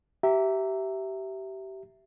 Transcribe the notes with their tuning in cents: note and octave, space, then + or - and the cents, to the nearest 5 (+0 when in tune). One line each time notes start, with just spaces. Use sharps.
G4 -25 E5 +0 A#5 -15